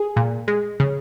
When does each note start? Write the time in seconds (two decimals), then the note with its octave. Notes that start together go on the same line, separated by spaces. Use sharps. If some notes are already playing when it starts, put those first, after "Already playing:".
Already playing: G#4
0.16 A#2
0.48 G#3
0.80 C#3